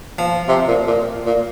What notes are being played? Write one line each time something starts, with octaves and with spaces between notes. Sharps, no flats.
F3
C3
A#2
A#2
A#2